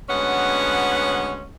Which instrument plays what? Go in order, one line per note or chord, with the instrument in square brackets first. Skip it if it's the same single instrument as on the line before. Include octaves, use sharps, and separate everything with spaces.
[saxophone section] D2 G#3 B3 C#4 C#5 F#5